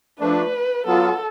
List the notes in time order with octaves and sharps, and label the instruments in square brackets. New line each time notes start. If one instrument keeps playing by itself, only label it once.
[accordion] F3 A3 D4 [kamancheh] B4
[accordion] F#3 B3 F4 [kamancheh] A4